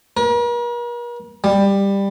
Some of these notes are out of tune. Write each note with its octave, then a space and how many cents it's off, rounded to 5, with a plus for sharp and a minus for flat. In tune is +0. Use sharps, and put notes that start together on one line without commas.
A#4 +45
G3 +15